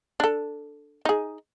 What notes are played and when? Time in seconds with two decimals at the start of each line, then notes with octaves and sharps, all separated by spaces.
0.20 D4 A4
1.05 D#4 G#4